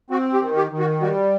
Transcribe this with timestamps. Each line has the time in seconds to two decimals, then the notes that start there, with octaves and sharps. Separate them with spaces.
0.10 C4 F#4
0.34 G4
0.41 D#3
0.56 G4
0.72 D#3
0.79 F#4
1.02 G3 F#4